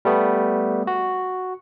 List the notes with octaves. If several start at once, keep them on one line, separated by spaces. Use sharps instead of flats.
G3 A3 B3
F#4